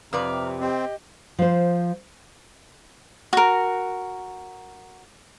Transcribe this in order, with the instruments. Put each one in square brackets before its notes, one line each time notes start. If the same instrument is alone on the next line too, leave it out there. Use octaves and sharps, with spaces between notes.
[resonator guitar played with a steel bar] F2 B4 D5 [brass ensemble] C3 [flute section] A#5 F6
[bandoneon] C4 [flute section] G4 D#5
[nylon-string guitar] F3 C5
[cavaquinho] F#4 A#4